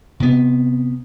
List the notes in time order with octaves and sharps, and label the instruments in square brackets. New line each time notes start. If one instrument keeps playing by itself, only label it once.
[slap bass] C3 B3